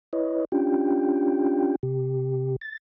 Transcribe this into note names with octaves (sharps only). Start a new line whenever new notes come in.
E4 B4 C#5 D#5
C#4 D4 F4 G4 G5
C3 G4
A6